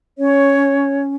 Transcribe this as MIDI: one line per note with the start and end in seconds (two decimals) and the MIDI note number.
0.18 1.16 61
0.18 1.02 73